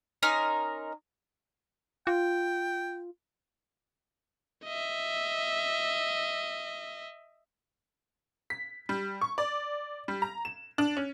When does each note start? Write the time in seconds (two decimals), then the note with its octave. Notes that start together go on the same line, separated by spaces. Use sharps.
0.23 C#4 D#4 A#4 C6
2.07 F4 G5
4.65 D#5 E5
8.50 B6
8.89 G3
9.21 C#6
9.38 D5
10.08 G3
10.22 A#5
10.45 E7
10.78 D4
10.97 C#4